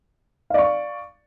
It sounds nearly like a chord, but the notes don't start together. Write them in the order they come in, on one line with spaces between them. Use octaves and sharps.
F5 D5 C#6